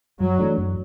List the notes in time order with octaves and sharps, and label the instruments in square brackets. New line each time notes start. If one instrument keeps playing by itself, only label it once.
[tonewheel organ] F#2 [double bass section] F#3
[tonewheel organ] E3 A3 D4
F#2